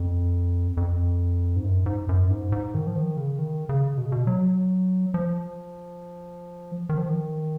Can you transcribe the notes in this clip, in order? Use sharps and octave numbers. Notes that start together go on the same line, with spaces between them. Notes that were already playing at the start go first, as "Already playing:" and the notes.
Already playing: F2
F2
G#2
F#2
G#2
F#2
G#2
G#2
D#3
F3
D#3
C#3
D#3
C#3
B2
C#3
B2
F#3
F3
D#3
F3
D#3